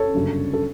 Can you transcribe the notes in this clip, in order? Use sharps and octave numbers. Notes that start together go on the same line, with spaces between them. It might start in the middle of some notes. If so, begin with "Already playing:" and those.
Already playing: A4 C#5
G1 F#2 C#3 G3 D4
A4